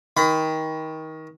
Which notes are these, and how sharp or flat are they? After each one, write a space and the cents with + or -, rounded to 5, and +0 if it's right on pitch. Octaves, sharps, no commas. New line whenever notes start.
D#3 +25 B5 +35